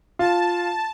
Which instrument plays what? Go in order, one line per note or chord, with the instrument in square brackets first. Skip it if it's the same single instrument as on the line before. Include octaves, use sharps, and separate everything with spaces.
[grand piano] F4 [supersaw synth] A5